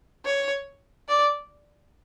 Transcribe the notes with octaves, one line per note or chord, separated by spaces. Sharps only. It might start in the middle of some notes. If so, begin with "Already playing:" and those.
C#5
D5